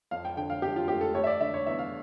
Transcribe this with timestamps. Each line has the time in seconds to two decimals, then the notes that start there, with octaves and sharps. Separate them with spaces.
0.11 F2 F5
0.25 G5
0.37 D3 G5
0.50 F5
0.62 F2 G4
0.76 F4
0.88 A3 G4
1.01 A4
1.14 A3 C#5
1.24 E5
1.27 D5
1.41 D3 E5
1.54 C#5
1.66 E2 E5
1.79 F5